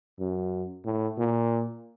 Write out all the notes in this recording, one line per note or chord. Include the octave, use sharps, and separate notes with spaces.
F#2
A2
A#2